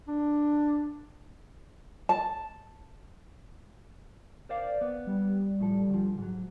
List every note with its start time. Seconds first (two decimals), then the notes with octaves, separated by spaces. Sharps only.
0.08 D4
2.09 A5
4.49 A#4 C5 D5 F5
4.81 B3
5.07 G3
5.60 A2 F3 A4
5.90 D2 F3
6.18 G#2 F#3